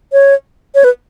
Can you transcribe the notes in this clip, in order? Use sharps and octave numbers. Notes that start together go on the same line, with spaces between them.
C#5
C#5
B4